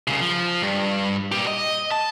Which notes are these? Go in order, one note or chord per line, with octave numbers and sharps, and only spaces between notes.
C2 C#3
F3
G2
A#2 G4
D#5
A5